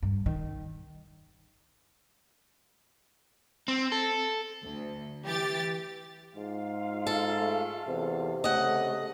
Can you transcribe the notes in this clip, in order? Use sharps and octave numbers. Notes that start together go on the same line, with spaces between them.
G2
D#3
C4
A4
D2
E3 G4 A6
G#2 F4 F5
A4
A3
E2 C3
C#3 A3 D#5 F#5